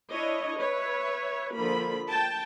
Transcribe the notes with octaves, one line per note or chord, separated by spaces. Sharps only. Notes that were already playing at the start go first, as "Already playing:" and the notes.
D4 E4 C#5 D#5
B4 C#5 E5
D3 F3 A#3 B5
G5 A5